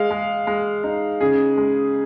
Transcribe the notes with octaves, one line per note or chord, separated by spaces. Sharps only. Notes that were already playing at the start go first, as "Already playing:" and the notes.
Already playing: G#3 F5
G#3
G#3
D#4
C#3 G#4
G#3